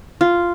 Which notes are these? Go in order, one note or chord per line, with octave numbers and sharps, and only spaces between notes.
F4